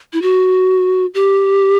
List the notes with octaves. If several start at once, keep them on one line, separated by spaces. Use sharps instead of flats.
E4
F#4
G4